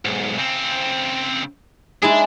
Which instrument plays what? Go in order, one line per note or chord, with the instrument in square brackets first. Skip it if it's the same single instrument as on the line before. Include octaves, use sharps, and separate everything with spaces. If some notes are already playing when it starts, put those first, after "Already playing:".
[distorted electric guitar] B1 G#2
C#3 C4
[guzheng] G#3 E4 G#4 [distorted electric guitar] D4